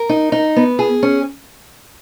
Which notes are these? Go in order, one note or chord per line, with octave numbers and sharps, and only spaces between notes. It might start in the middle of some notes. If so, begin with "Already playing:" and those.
Already playing: A#4
D#4
D#4
B3
G#4
C#4